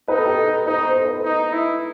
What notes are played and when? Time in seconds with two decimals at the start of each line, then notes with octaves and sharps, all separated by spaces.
0.08 D#4 B4
0.17 A4
0.25 G4
0.34 A4
0.66 D#4 B4
0.76 D#5
0.86 C5
0.99 A4
1.05 B4
1.24 D#4
1.53 E4